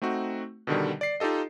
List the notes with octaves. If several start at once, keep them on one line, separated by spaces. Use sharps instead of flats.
A3 C4 D#4 F#4
B2 D3 D#3 G3
D5 C7
D#4 F4 G4 A4 D#5